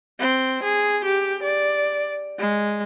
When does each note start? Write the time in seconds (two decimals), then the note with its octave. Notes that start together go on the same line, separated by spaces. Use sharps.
0.20 C4
0.63 G#4
1.05 G4
1.43 D5
2.39 G#3